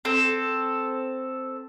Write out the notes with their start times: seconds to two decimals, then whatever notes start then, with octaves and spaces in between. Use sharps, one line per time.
0.05 C4 A4